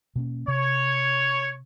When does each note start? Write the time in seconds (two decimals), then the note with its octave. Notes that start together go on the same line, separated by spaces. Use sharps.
0.16 B2 A#3 C#4
0.48 C3 C#5